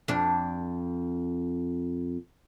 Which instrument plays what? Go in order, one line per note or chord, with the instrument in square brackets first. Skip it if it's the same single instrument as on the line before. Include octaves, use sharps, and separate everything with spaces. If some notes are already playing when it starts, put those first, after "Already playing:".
[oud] F2 D4